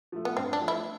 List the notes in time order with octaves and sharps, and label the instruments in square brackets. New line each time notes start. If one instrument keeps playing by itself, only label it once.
[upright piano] F3 A3
[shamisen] B3
[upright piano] G2 [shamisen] C4
[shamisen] D4
[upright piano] F3 A3
[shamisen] E4